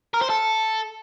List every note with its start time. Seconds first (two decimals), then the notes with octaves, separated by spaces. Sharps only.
0.14 A#4
0.22 C5
0.29 A4